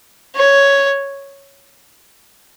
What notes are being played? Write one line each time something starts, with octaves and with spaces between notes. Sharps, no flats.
C#5